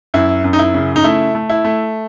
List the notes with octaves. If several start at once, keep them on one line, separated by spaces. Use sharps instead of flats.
F#2 E4
F#2
D#4
E4
C#3
D#4
A3 E4
A3
E4
A3